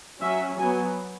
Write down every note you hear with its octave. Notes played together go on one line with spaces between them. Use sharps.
F#3 C#4 E5
F#3 B3 G#5